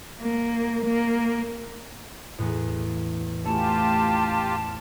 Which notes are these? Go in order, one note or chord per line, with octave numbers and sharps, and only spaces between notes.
A#3
A#3
E2 A2
A3 C#4 E4 F4 G4 A5